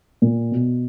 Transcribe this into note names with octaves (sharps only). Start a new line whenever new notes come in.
A#2
B2